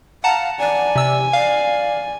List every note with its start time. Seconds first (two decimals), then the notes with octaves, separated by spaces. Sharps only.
0.24 F5 F#5 A5 A#5
0.59 D5 G#5
0.95 C3 E6
1.33 D5 F5